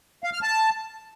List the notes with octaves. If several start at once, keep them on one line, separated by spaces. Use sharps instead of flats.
F5
F6
A5